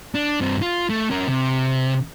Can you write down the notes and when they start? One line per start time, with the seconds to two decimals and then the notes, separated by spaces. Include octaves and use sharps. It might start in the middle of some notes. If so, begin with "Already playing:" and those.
0.15 D4
0.41 G2 C4
0.62 F4
0.90 A3
1.10 C#4 A#4
1.28 C3